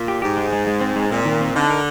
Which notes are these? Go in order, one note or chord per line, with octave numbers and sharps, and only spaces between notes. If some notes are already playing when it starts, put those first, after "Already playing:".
Already playing: A#2
G4
G#2 G4
G#3
G#3
G#3
C4
G#3
A#2 C4
D#3
C4
D3 D#4
A#4